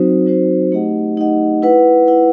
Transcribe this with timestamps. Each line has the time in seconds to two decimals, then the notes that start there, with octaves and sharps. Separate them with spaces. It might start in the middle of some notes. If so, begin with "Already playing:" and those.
Already playing: F#3 C4 D#4 F#4 C5
0.26 F#3 C4 D#4 F#4 C5
0.72 A3 D#4 G4 D#5 F#5
1.17 A3 D#4 G4 D#5 F#5
1.62 E4 B4 F#5
2.07 E4 B4 F#5